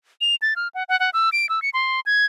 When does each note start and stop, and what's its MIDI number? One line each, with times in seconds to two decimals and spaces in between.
0.21 0.35 101
0.42 0.54 93
0.56 0.68 89
0.75 0.83 78
0.89 0.98 78
1.00 1.10 78
1.13 1.29 88
1.32 1.49 98
1.49 1.62 88
1.62 1.70 97
1.74 2.00 84
2.06 2.26 92